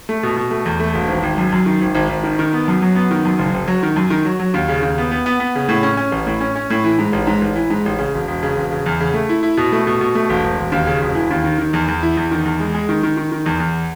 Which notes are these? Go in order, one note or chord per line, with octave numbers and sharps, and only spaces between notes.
A3
B2
B2
A3
E2
A3
E1
G#1
G#1
F#2
F#2
D#3
G#1
G#1
G#1
D#3
D#3
B3
F#2
F#3
B3
D#3
F#2
F#1
F#1
F#3
D#3
F#2
D#3
F#3
F#3
D#2
C#3
D#2
B3
B3
B3
B3
C#3
A2
C#4
C#4
A1
A2
C#4
C#4
A2
E3
G#2
A1
G#2
A1
E3
G#2
A1
C#3
E1
E1
C#3
E1
C#3
E2
C#3
A3
E4
E4
B2
A3
B2
B2
A3
E1
E1
E1
D#2
C#3
E1
E3
D#2
D#3
D#3
E2
E2
E4
E2
D#3
E2
G#3
G#3
D#3
D#3
D#3
D#3
E2
E2